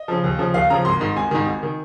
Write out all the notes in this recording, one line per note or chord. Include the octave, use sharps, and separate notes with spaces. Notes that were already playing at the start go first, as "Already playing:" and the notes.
Already playing: D#5
C#3 F3
D#2
C#3 F3
D#2 F5
C#3 F3 A#5
G#1 C6
G#2 D#3
G#1 G#5
G#2 D#3
G#1
D#3